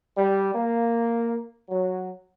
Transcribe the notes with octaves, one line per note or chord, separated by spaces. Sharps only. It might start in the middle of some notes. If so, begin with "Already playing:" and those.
G3
A#3
F#3